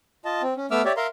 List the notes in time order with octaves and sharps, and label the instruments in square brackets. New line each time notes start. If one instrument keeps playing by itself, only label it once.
[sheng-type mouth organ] F4 D#5 A5
C4
C#4
A3 B3 E5 D6 E6 F6
G4 C#5 D5 E5
A#4 E5 F5 A#5 C6